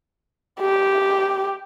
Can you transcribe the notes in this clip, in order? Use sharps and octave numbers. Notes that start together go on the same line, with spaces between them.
G4